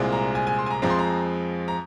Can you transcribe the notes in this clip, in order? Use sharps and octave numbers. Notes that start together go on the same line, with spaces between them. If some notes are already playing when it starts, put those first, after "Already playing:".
Already playing: C2 A#2 G#3 C4
A#5
G#5
G#5
C6
G#5
A#5
F2 F3 G#3 C4 A#5
C6
A#5
A#5